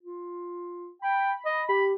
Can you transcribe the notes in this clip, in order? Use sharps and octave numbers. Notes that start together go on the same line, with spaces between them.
F4
G5 B5
D#5
G4 B5